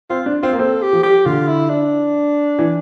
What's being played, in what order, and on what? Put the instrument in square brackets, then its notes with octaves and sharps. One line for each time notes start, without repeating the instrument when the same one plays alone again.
[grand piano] C4 [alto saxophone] F4
[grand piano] D4
[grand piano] C4 [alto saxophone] F4
[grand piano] A#3
[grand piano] C4 [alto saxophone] A4
[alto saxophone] G4
[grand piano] F3
[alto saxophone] G4
[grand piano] D3 [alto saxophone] F4
[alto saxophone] E4
D4
[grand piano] E3